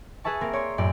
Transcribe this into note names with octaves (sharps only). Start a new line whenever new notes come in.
G#4 B4 E5 A5 C#6
A#3 C4 A#4
C#5 D5 C6
F#2 A2 D5 G6